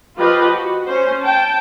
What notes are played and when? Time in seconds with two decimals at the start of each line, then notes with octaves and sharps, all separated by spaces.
0.17 F3 F4 G4 B4 D#5
0.54 F#4
0.87 C#4 C5
1.22 G5 A5